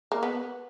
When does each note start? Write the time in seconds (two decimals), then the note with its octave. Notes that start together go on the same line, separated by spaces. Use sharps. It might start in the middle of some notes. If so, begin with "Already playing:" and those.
0.12 A#3
0.23 B3